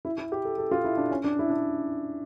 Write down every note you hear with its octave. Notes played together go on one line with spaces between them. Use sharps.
E4
E4
G4
A4
A4
F4
E4
D4
C#4
D4
E4
D4